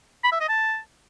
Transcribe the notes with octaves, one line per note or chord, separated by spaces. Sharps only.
B5
E5
D#5
A5